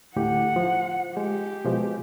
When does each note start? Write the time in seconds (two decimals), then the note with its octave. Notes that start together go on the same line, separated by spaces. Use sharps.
0.16 D2 A2 G4 F#5
0.56 F3
1.17 G#3 G4
1.65 B2 F3 G#3